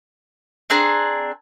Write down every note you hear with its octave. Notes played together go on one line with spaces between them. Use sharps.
C4 D4 G#4 A#5